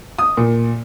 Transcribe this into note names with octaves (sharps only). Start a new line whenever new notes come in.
D#6
A#2